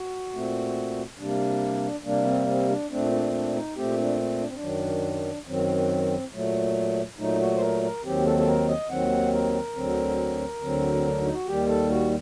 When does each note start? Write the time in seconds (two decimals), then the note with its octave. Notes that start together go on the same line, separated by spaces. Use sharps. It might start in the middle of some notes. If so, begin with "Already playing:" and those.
Already playing: F#4
0.33 A#2 A3 C4
1.19 C3 G3 A#3 D4
2.05 C3 G3 A#3 D4
2.26 C4
2.47 C4
2.69 D4
2.90 A#2 A3 C4 D4
3.12 D4
3.33 D4
3.54 D#4
3.76 A#2 A3 C4 G4
3.97 D4
4.40 D4
4.47 C4
4.54 D4
4.62 F#2 D#3 F#3
5.47 F#2 D#3 F#3 C4
6.33 A#2 F#3 A3
7.18 A#2 F#3 A3 D#4
7.40 F#4
7.56 C5
7.62 A#4
7.83 A#4
8.04 D#2 D#3 F#3 C4 G4
8.26 A4
8.38 A4
8.47 A#4
8.68 D#5
8.90 D#2 D#3 F#3 C4 F#5
9.33 A#4
9.75 D2 D3 F#3 C4
10.61 D2 D3 F#3 C4
10.93 C4
11.07 D4
11.21 D#4
11.33 F#4
11.47 D#2 D#3 G3 G4
11.69 A4
11.90 F#4